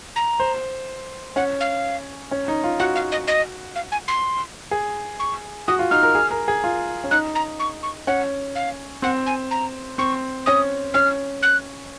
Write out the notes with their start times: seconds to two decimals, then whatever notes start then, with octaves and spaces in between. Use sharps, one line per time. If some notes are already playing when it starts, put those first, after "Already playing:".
0.16 A#5
0.40 C5
1.36 C#4 F#5
1.60 F5
2.31 C#4
2.48 D#4
2.64 F4
2.79 F#4 F#5
2.96 F5
3.12 D#5
3.28 D#5
3.76 F5
3.92 G#5
4.08 C6
4.71 G#4
5.20 C#6
5.68 F#4 D#6
5.79 F4
5.91 D#4 F6
6.03 A#4
6.15 G#4
6.31 A#4
6.48 G#4
6.64 F4
7.04 C#4
7.11 D#4 F#6
7.35 A#5
7.60 C#6
7.83 C#6
8.07 C#4 F#5
8.55 F5
9.02 C4 F#5
9.26 G#5
9.51 A#5
9.98 C4 C#6
10.46 C#4 D#6
10.94 C#4 F6
11.43 F#6